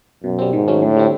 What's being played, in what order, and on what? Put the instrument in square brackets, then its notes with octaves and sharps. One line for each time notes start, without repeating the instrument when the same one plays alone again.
[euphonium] F#2 [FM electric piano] B2
[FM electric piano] G3 C4
[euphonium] G#2 [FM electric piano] D#3
[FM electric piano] F#3 A3 C#4
[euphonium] A2 [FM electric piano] D3
[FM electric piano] G3 C4